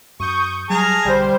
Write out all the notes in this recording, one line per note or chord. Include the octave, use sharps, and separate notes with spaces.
F#2 C#6 D#6 G6
F#3 G3 G#4 A5 A#5 F6 G#6
B1 D3 G3 G4 C5